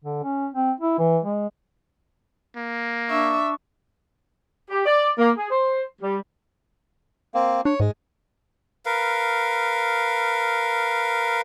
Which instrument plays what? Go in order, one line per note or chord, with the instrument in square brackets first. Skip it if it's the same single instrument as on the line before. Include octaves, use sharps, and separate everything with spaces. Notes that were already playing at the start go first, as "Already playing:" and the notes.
[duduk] D3
C#4
C4
E4
E3
G#3
[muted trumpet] A#3
[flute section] D4 C#6 [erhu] E5
[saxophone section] G4
D5
A#3
G#4
C5
G3
[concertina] A#3 C4
[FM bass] D4 [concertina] C#5
[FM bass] G#2 [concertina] G#3
[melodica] A#4 B4 F5